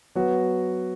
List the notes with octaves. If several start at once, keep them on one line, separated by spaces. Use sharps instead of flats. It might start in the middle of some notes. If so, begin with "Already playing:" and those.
F#3 B3 F#4